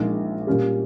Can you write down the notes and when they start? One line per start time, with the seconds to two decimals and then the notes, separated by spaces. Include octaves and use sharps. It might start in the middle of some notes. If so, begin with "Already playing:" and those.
Already playing: A#1 A#2 G#3 D#4
0.47 A#2 G3 C#4 G4